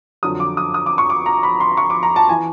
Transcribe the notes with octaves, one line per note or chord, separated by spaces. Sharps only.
F2 D3 F#3 D#6
D6
D#6
D#6
D6
C#6
D6
A#5
B5
C6
C#6
D6
A#5
A5
E3 G#5